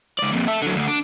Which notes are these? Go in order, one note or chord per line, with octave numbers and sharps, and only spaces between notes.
C#2 D5
F2 A#2
A4 E5
D3 F#3
D2 D3
D4